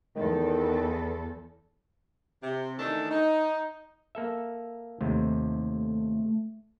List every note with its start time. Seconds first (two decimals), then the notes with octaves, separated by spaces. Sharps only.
0.15 E2 D#3 A4
2.43 C3
2.78 D#3 E3 A3 D4 D#4 A4
3.11 D#4
4.15 A#3 A4 E5
5.01 D#2 C3 A3